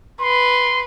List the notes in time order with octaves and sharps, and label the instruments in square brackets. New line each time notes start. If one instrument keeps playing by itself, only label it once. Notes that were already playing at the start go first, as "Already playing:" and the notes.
[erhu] B4 [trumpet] C6